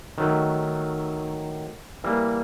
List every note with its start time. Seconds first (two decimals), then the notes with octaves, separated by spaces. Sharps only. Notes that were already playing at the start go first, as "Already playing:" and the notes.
0.18 D#3 F#3 A3
2.04 E3 G3 A#3